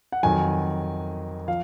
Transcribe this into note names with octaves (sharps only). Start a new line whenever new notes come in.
F#5
F2 D#3 F#3 G#5
F3 F5